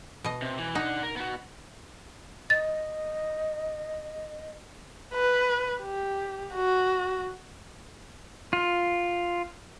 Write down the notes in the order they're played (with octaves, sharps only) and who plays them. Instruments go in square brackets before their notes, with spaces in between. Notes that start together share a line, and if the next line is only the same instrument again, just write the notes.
[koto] B2 D#5
[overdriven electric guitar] C3
E3
[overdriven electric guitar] D4 F#5 [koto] D#4
[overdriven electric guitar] A#4
B3 F#4
[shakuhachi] D#5 [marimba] A6
[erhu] B4
G4
F#4
[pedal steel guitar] F4